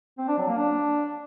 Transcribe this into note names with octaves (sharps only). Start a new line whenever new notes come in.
C4
D4
F#3
A#3
D4